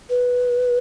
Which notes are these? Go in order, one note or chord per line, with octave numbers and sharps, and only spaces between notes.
B4